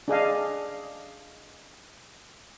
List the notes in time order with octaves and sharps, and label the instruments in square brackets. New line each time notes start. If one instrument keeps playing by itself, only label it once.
[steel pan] D4 G#4 D#5 F5